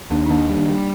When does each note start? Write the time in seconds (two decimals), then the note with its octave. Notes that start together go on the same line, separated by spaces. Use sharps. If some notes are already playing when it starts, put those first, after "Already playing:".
0.10 D#2 A#3 D4
0.26 D#4
0.30 D#3 A#3 D4
0.49 G3
0.56 A#3 D4
0.69 G3